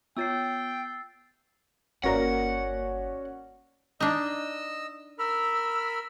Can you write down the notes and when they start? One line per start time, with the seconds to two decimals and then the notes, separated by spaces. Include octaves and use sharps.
0.17 B3 F4 C#5 G5 E6 A6 C7
2.04 G1 A#3 C#4 F#4 A#4 D5 F#5 A#6
4.00 D4 D#4 D#5 E6
5.19 A#4 B5 E6 F6